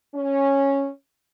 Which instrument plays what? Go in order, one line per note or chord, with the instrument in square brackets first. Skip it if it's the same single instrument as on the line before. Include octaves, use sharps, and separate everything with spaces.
[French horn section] C#4